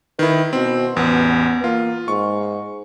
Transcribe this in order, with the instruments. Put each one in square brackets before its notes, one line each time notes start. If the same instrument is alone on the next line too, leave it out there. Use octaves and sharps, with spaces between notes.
[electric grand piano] D#3 E4 [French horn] B4
[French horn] B2 [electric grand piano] C4
[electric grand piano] A1 E2 [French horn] B3
[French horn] A#3 [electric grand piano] F4
[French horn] G#2 [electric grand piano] C#6